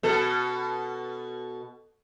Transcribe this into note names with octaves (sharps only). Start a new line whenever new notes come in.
B2 A4